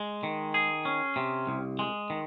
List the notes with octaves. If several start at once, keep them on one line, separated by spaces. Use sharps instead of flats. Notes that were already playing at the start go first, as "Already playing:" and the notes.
Already playing: G#3
D#3
G#4
C#4
C3
C2
G#3
D#3